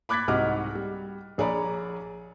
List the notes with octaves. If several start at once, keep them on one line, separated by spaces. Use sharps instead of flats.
B5 D6 F#6 G#6 A6 B6
C2 G#2 F#4 D#5 D6 F6
G3
A#1 G#4 C#5 D5 A#5 B5